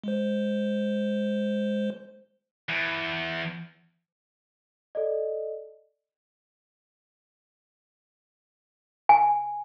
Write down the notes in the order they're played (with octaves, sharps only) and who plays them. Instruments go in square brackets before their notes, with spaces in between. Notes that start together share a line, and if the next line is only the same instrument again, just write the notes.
[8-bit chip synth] G#3 C5
[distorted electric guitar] E2
[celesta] A4 D5 D#5
[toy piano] G#5